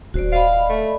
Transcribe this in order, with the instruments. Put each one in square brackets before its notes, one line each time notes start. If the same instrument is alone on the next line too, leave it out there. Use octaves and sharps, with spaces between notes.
[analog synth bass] D#1 [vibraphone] F#4 C5 D5
[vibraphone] D5 D#5 B5 [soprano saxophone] F5
[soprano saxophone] A3